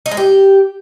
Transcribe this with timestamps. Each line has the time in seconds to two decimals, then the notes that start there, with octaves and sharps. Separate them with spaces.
0.06 D#4
0.11 G#3
0.17 G4